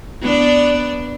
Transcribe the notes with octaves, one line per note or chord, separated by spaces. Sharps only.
B3 D4 D5